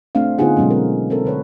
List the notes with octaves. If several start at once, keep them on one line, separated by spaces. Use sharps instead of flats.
A3 C4 D4 F5
D3 B3 D#4 F4 G#4 F#5
B2 F#3 G#3 B3 C#4
C4 A#4
C4 A4 A#4
D3 B4 C#5